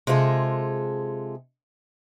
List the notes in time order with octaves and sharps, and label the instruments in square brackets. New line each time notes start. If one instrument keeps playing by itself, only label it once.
[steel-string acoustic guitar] C3 G#3 F4 G#4 A4